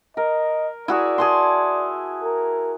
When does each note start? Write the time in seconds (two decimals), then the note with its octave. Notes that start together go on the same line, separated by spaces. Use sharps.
0.17 A#4 D#5
0.88 E4 F#4 G#4 D5
1.18 G#4 A5 C6
2.24 A#4